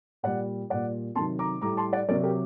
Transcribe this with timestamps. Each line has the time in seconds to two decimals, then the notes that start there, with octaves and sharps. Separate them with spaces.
0.23 A#2 G3 D5 F#5
0.70 A#2 G3 D5 F#5
1.15 C3 D#3 F#3 A5 C6
1.39 A#5 D6
1.61 A2 G3 A#5 D6
1.77 A5 C6
1.93 D5 F#5
2.08 C3 F#3 A#4 D5
2.23 G4 A#4